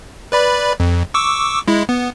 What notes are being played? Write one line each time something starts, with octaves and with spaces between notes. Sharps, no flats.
B4 D5 B5
F2
C#6 D6 E6
G#3 E4
B3